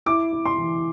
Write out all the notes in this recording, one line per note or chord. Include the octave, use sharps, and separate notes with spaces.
E4 D6
E4
C6
E3